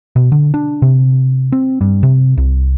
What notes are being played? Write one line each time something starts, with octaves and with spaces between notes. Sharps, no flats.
B2
D3
D4
C3
C4
G2
C3
C2